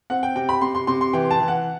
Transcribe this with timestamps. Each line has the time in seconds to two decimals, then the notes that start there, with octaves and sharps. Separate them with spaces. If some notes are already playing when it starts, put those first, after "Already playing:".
0.10 C4 F#5
0.23 G5
0.35 C3 G5
0.49 B5
0.61 C3 C6
0.75 C6
0.87 C3 C6
1.01 C6
1.13 E3 G5
1.31 A5
1.40 E3
1.48 F#5